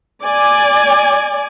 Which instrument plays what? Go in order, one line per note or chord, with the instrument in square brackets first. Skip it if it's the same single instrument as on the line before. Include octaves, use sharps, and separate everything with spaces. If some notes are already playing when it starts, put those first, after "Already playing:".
[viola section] D5 G#5